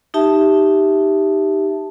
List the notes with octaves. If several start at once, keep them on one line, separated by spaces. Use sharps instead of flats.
D#4 G4 E5 A5